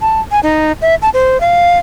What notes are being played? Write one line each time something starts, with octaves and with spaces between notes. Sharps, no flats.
A5
G#5
D#4
E5
A5
C5
F5